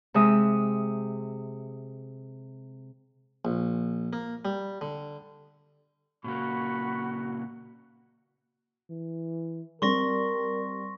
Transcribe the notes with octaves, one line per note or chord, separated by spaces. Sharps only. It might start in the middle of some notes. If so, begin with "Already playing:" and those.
C3 G#3 E5 D#6
A#1
A#3
G3
D3
A#2 C#3 A#3 F#4 B5 C#6
E3
G3 C4 A#4 C6 C#6 A#6